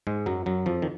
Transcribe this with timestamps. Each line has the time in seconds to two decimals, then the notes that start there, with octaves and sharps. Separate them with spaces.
0.07 G#2 G#3
0.26 F#2 F#3
0.46 F#2 F#3
0.66 F2 F3
0.82 D#3